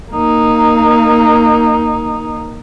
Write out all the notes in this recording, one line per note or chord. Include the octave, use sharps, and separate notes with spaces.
A#3 D#4